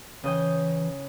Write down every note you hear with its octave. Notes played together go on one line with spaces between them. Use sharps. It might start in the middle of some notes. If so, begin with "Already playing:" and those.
C#3 E3 D#5 G5